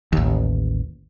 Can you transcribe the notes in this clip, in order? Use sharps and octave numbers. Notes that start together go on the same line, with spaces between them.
A1 D#2